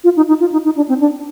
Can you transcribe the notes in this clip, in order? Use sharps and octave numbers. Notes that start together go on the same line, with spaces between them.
F4
D#4
D#4
F4
D#4
D#4
D4
C4
D4